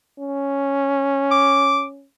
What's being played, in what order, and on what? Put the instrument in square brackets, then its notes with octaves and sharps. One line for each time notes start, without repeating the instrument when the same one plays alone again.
[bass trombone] C#4
[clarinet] D6